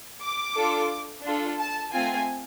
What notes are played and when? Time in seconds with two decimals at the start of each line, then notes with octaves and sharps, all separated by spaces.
0.21 D6
0.56 D4 F4 A4
1.23 D4 F4 A4
1.58 A5
1.92 A3 C4 F4 G#5